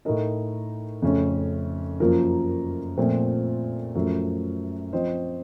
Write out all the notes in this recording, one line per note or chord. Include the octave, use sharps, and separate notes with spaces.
A2 A3 D#4 A#4 D#5
F2 C#3 A3 C#4
F#2 F3 A#3 F4 A#4
A#2 F3 A3 C4
F#2 F3 A3
F3 C4 F4 C5 D#5